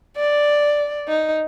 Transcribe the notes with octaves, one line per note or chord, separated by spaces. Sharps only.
D5
D#4